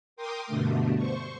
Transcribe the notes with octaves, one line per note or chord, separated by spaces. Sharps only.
A#4 G5 C6 D6 D#6
G2 B2 D3 A3
C5 C#6